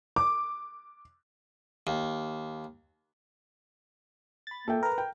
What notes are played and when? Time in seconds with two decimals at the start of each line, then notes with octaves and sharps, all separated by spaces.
0.16 D6
1.87 D#2
4.47 B5 A6
4.68 A#2 A#3 A4 E5 G5
4.83 A#4 B4 A#5
4.98 G5